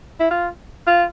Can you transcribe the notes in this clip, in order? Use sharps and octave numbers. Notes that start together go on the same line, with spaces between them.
E4
F4
F4